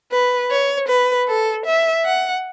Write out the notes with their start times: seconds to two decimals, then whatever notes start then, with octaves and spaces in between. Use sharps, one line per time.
0.12 B4
0.51 C#5
0.89 B4
1.28 A4
1.66 E5
2.05 F#5